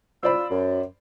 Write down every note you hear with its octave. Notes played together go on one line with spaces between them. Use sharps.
F4 C5 D5 B5 E6
F#2